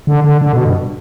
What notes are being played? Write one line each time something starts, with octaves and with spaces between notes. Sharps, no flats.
D3
D3
D3
B2
G2